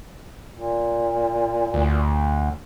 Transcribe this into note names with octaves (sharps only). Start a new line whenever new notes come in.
A#2
D2